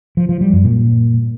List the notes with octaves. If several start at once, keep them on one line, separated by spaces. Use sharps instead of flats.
F3
F3
G3
F#2
A#2